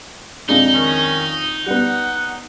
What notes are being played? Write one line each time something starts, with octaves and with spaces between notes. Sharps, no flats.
F2 G#3 D4 D#4
D#3 C#4
G3 B3 F#5